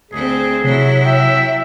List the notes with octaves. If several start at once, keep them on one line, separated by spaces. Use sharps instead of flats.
D2 C4 G#4
C3 F#3 E4
E5 G5